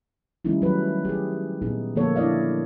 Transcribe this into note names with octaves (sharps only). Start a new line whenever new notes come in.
D#3 G3 A3 C#4 D#4 E4
F#3 B4
G4 G#4
A#2 B3 D#4 G#4
D3 F3 A3 A#3 A4 C#5
D4 E4 D5 D#5 F5